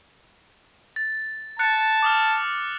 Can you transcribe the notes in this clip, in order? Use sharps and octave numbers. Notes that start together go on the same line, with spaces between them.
A6
A5 F#6 A6 C#7
D6 D#6 F6